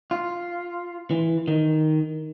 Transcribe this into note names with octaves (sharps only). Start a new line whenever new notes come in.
F4
E3
D#3